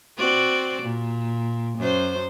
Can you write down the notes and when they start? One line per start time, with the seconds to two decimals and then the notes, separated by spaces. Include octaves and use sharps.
0.17 C4 F#4 D5
0.82 A#2
1.78 F#2 C5